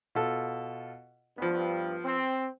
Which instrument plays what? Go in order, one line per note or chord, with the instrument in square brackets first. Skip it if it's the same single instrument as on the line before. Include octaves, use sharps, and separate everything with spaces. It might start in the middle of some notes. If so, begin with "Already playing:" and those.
[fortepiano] B2 F4 A4
[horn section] G2 [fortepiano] F3 B3
[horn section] C4